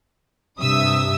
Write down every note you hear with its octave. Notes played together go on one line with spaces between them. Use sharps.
G2 C3 E5 D#6 E6